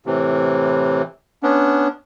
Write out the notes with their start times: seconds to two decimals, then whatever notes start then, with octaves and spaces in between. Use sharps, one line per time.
0.06 A2 C3 E3
1.43 B3 C#4 D4